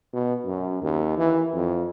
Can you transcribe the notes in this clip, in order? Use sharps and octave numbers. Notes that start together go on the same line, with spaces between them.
B2
F#2
D#2
E3
F2